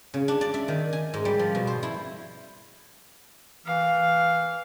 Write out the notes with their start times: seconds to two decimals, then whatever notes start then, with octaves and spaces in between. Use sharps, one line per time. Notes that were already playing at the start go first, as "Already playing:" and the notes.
0.14 C#3
0.28 D4
0.41 D5
0.54 E5
0.68 D#3
0.93 G#5
1.14 G#2
1.25 G3
1.39 F3
1.55 B2
1.67 C5
1.83 E4
3.66 E3 F5